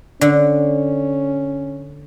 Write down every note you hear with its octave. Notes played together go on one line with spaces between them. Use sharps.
D3 C#4